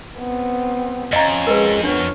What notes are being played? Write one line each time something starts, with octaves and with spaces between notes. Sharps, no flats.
B3 C4
F2 C#4 D#5 F5 A#5
G#3 A#4 B4
B3 D4 C#5 F6